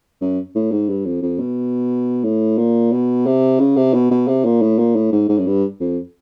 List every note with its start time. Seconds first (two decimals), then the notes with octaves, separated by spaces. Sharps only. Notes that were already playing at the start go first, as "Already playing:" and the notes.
0.21 F#2
0.55 A2
0.72 G#2
0.89 G2
1.05 F2
1.22 F2
1.40 B2
2.24 A2
2.58 A#2
2.92 B2
3.26 C3
3.60 C#3
3.77 C3
3.94 B2
4.11 B2
4.28 C3
4.45 A#2
4.62 A2
4.79 A#2
4.96 A2
5.12 G#2
5.29 G#2
5.39 F#2
5.47 G2
5.80 F2